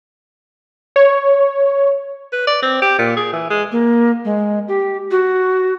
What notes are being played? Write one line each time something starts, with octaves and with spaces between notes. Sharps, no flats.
C#5
B4
D5
C4
G4
A#2
G#4
E3
G#3
A#3
G#3
G4
F#4